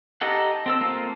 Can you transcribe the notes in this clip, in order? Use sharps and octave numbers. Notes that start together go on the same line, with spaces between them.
D#4 G4 A4 F#5
C4 A4 E6
A3 A#3 C4 F4